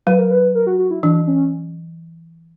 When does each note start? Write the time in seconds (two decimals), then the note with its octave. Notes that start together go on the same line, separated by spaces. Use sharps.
0.06 F#3 B4
0.19 A#4
0.31 B4
0.55 A#4
0.67 F#4
0.79 F#4
0.91 E4
1.03 E3 D4
1.27 C#4